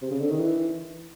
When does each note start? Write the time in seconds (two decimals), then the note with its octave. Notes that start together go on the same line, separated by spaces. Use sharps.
0.02 C3
0.11 C#3
0.20 D3
0.30 D#3
0.40 E3